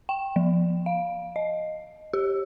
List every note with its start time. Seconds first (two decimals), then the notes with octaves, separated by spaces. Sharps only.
0.09 G5
0.36 F3
0.86 F5
1.36 D#5
2.13 G4